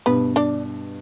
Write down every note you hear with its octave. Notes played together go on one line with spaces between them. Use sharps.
G2 B2 B3 B4
D4 D5